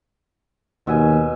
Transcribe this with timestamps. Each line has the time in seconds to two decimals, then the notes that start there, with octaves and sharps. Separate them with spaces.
0.87 D#2 B2 E5 G#5